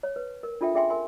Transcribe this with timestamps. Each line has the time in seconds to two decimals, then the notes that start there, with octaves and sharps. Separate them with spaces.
0.03 C#5
0.16 B4
0.43 A#4
0.61 D4 F4 A4 E5 G5
0.74 C#4 G#4 E5 G5 G#5 C6
0.90 A#4 G#5 C6